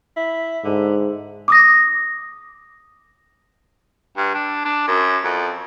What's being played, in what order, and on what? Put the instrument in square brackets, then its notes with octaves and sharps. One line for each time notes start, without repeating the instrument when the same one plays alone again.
[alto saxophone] E4
[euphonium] G#2 [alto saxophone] D3
[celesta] D6 D#6 A#6
[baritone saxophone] G2
D4
D4
F#2
F2